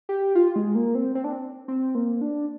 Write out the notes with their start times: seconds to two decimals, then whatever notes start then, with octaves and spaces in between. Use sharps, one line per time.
0.09 G4
0.35 F4
0.56 G#3
0.75 A#3
0.95 C4
1.15 C4
1.24 D4
1.33 C4
1.68 C4
1.95 A#3
2.21 D4